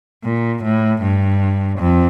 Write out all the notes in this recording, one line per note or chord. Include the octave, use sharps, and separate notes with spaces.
A#2
A2
G2
F2